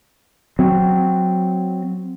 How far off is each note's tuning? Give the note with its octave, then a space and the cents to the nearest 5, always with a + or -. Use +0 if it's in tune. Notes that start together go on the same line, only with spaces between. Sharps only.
F#3 -5 C4 -5